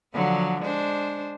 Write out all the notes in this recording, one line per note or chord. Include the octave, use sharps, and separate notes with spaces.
D3 F3 F#3
G#3 D4 C5